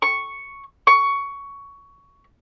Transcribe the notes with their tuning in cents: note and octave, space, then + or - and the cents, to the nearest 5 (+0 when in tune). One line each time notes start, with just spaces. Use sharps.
C#6 +0
C#6 +15